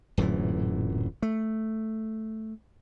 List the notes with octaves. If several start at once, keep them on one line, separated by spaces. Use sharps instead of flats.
D1 F#2 A#2 E3
A3